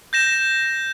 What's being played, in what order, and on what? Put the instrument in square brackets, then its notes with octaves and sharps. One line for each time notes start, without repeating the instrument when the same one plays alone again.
[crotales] G6 A#6 E7